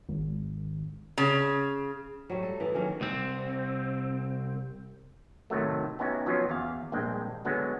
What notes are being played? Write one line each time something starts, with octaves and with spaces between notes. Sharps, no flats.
G#1
C#3
F#3 G3 A3
A4
E3 B3 A4
D#3 F#3 A#3 C#4
C2 C4
A2 C3 D#3 F#3 A3
B3 C#4 D#4 E4 F#4 G4
F3 F#3 B3 C#4 F4 F#4
E2 F5
A#1 G2 G#3 C4 G5
D3 F#3 G#3 B3 F#4